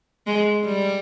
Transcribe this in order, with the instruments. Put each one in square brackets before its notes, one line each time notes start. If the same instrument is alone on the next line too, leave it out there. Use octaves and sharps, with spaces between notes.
[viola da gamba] G#3
G3